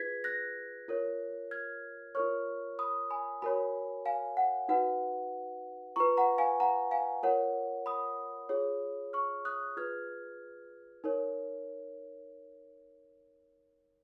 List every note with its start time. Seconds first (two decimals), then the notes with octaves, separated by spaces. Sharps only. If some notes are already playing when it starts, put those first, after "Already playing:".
Already playing: F4 G#4 B4 G#6 B6
0.24 F#6 A#6
0.88 F4 A#4 C#5
1.51 F6 G#6
2.15 F4 A#4 C#5 C#6 F6
2.79 B5 D#6
3.11 G#5 B5
3.42 F#4 A#4 C#5 G#5 B5
4.06 F5 G#5
4.37 F#5
4.69 D#4 F#4 B4 F#5
5.96 F4 B4 A#5 C#6
6.17 F#5 A#5
6.38 F5 G#5
6.60 F#5 A#5
6.91 F5 G#5
7.23 F4 A#4 C#5 F#5
7.86 B5 D#6
8.49 F4 G#4 C#5
9.13 C#6 F6
9.45 D#6 F#6
9.77 F4 G#4 B4 F6 G#6
11.04 D#4 A#4 C#5